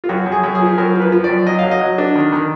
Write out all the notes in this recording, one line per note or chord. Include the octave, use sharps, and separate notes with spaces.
F4
F#2 F#4
F#2
G#4
F#2
G#4
F3
F#2 A#4
F3
B4
F3
D5
F#2
F#3 D#5
F#3 F5
D#5
F#3
D4
D#3
D#3